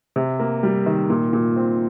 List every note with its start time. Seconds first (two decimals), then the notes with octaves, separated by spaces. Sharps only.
0.16 C3
0.39 A#3
0.63 G3
0.86 D#3
1.10 A#2
1.33 A#2
1.56 C4